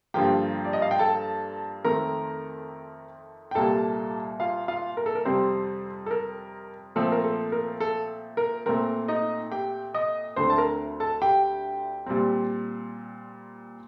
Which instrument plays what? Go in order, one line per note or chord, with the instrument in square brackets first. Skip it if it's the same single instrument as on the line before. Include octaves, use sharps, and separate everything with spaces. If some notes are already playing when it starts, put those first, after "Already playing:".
[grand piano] G2 D3 F3 A#3 G4 G5
D5
D#5
F5
G5
A4 A5
F2 D#3 A3 C4 A#4 A#5
G5
C2 A#2 G3 A#3 A4 A5
F4 F5
F4 F5
A#4
A4
A#4
F2 C3 G3 C4 C5
A4
A#4
A#2 F3 A3 C4 A4
A#4
A4
A#4
A4
A#4
A#2 A3 C4 A#4
D#4 D#5
G4 G5
D#5 D#6
D2 D3 A3 C4 C5 C6
A5
A#4 A#5
A4 A5
G4 G5
A#2 G3 C4